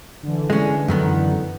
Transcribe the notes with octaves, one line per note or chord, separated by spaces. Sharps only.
D3 E3
G#3 C#4
F#2 D#3 B3